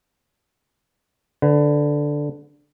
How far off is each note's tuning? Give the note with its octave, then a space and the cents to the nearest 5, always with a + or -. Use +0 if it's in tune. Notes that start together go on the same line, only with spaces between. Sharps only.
D3 +0 B4 +30